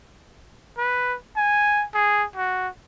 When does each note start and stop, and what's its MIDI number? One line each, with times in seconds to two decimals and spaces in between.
0.78 1.15 71
1.36 1.85 80
1.94 2.25 68
2.36 2.68 66